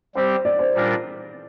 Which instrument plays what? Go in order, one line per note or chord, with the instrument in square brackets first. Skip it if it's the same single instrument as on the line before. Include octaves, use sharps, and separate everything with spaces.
[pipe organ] G3 C4 G4 [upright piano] C5
[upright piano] D5
C5
[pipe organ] A#2 G3 D4 F4 A#4